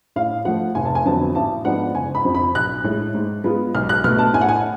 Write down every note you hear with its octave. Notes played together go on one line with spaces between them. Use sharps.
A2 F5
F3 A3 F#5
F1 G#5
A5
G#5
F2 D3 F#3 B3 A5
A1 A5
G#2 F3 B3 D4 F#5
F#1 G#5
B5
F2 F3
B5
B1 F#6
A2 G#3
G#2
G#3 B3 F4
B1 F6
F#6
B2 A3 F6
A5
A2 G#5
F#5
G#5